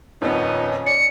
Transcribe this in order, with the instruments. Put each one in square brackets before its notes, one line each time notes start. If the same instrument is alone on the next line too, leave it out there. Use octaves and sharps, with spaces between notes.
[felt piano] D#1 F2 [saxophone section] B3 D#4 [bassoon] C#4
[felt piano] D5 [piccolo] C#7